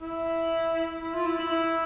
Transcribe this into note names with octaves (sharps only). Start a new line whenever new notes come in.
E4
E4
F4
E4
E4
E4